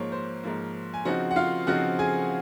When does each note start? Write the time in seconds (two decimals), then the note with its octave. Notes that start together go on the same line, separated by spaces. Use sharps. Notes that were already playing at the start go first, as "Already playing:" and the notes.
Already playing: G#2 F3 A#3 C#5
0.12 C5
0.43 G#2 F3 A#3
0.94 G#5
1.05 C#3 F3 C4 D#4 F#4 F#5
1.31 F#5
1.36 F4 F5
1.67 C#3 F3 C4 D#4 F#4 F#5
1.99 G#4 G#5